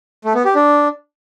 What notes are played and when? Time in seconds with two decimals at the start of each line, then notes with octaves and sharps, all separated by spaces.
0.24 A3
0.35 B3
0.45 G4
0.55 D4